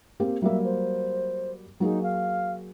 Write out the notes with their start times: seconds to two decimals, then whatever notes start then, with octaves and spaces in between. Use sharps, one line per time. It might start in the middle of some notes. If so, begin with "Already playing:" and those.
0.20 A#3 C4 G4
0.42 F#3 G3 A#3 E5
0.64 C5
1.80 F#3 A#3 D#4 G#4
2.03 F5